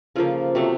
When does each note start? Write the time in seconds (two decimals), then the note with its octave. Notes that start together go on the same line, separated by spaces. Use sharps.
0.16 C#3 F3 A#3 F4 A4
0.55 C3 F#3 A3